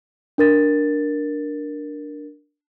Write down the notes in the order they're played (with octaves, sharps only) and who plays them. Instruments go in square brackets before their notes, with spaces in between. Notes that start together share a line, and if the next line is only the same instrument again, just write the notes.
[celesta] D4 A#4 A6